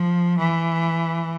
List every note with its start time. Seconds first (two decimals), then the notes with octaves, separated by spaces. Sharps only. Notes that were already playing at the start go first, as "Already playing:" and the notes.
Already playing: F3
0.39 E3